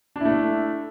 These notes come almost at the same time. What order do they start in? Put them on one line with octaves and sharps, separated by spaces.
D4 E4 A3